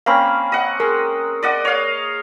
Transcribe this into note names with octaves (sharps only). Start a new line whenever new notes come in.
A#3 C4 C#4 F5 B5
D#5 F#5
G#3 A#4
D5 D#5 F#5
C#5 F5